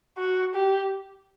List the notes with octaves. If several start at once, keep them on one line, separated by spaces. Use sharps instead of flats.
F#4
G4